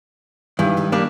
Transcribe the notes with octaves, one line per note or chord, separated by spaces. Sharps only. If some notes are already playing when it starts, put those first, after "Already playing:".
G2 D#3 E3 G#3 E4
D#3 D#4 G4
G3 A#3 D4